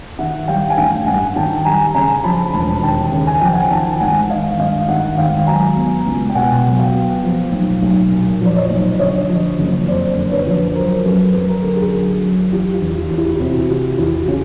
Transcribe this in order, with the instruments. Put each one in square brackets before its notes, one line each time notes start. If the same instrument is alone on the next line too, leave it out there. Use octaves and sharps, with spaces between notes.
[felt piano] D#3 E5 F#5
G3 F5 G5
G#5
A1 F5 G5
G2 F#5 G#5
D#3 G5 A5
G3 G#5 A#5
C#3 G#5 A#5
F3 A5 B5
E1 A5 B5
D#2 G5 A5
C#3
G#5
F3 G5
F#5 G#5
D#3 G5 A5
G#1 F#5 G#5
G#1 D#5 F5
G2 D#5 F5
D#3 E5 F#5
G#1 F5 G5
F#3 G#5 A#5
B3
C#2
G5
B2 F#5 G#5
F#3
F5 G5
B3
F3
B1
B1
A#2
F3 D5
C#5 D#5
B1
D3 C#5 D#5
F3
F#1
F2 C5 D5
D3
B4 C#5
F3
F#3 A#4 C5
F#2 A4 B4
F#2 B4
A#4
D3 A4
G#4 A#4
F#3
F#2
E3 F4 G4
F4 G4
E2
F4
E2 G4
E4 F#4
G4
C3 E4 F#4
E3 F4 G4
E2 E4 F#4
C#3 F4 G4